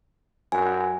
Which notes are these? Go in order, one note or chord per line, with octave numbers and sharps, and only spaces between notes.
F#2 G#5